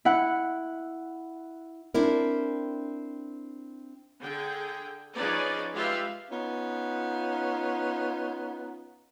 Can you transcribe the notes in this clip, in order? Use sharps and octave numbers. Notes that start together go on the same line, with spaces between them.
E4 F#5
C4 D4 E4 A#4
D3 G#4 G5
F3 C#4 D#4 G#4 B4 D5
G#3 F4 G4 B4 E5 F5
B3 C#4 D#4 F4